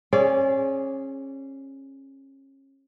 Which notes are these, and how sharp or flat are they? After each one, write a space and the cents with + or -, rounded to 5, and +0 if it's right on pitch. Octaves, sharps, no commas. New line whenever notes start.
C#4 -30 G#4 +0 D5 -30